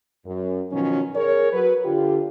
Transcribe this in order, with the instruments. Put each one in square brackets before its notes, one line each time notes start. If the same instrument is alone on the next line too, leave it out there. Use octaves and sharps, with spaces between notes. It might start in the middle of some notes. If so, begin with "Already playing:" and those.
[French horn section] F#2
B2 D#3 F3 F#3 C#4
G#4 A#4 C#5
F#3 B4
D3 F4 G4